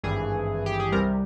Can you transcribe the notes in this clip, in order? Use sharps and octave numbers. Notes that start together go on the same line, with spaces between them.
G#1 G2 E3 G#4
G4
G#4
C2 C3 G3 A#4